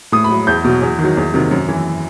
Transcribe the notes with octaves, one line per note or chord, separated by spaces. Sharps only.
A2 D#6
B5
F#3
E2 G6
B2 F#3
E2
D#3
F#3
E2
C3 D#3 F#3
F#2
E3